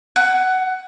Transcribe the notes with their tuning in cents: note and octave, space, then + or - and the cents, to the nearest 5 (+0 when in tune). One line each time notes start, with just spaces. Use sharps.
F#5 +15